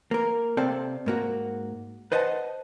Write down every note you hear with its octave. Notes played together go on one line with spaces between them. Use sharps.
A#3 A#4
C3 C4 A4 D5 F5 A5
G#2 A#3 F#4
B4 C5 D#5 F#5 G#5 A5